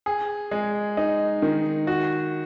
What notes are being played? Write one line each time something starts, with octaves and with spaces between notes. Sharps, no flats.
G#4
G#3
D#4
D#3
F#4